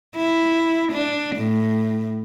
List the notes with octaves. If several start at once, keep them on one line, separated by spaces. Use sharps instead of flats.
E4
D4
A2